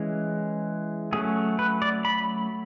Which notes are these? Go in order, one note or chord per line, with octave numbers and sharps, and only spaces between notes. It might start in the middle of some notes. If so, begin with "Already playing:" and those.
Already playing: E3 G#3 C#4
F#3 A3 C#4 G#4
B4
D5
B5